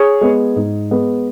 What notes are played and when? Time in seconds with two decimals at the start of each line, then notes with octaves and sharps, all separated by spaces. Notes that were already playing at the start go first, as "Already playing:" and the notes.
Already playing: G#4 C#5
0.21 G#3 B3
0.56 G#2
0.91 G#3 B3